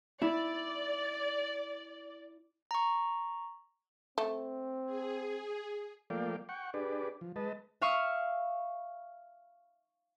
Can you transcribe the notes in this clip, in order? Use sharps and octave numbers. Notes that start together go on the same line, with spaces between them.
E4 D5
A#5 C#6
A3 C4
G#4
F3 A3 A#3 D5 F5 G5
F#5 G5 C#6
D4 G4 G#4 B4 D5
F3
G#3 B4 D#5 A5
E5 F5 C#6 D#6 F6